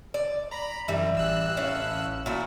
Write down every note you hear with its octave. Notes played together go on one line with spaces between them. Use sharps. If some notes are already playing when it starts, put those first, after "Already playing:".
D5
A#5 B5
F#2 E3 G3
A1 E6 F#6
A2 C#4 F5
A#2 E4 F#4